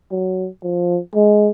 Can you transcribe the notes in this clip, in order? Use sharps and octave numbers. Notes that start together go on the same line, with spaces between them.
F#3
F3
G#3